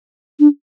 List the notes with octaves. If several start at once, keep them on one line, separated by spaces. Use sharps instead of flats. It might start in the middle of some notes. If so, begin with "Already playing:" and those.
D4